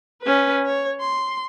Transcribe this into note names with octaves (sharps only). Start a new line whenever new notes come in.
C#4 B4
C#5
C6